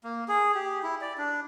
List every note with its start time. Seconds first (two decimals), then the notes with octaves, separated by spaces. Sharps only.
0.04 A#3
0.28 G#4
0.55 G4
0.83 E4
1.01 D5
1.18 D4